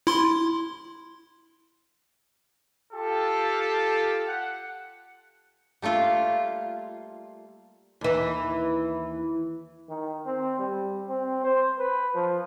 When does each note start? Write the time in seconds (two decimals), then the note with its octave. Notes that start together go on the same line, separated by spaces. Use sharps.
0.07 E4 C6
2.93 F4 G4 A4
4.28 F#5
5.82 G3 A3 A#3 F4
8.01 D#2 E3
9.89 D#3
10.26 C4
10.59 G3
11.08 C4
11.44 C5
11.79 B4
12.15 F3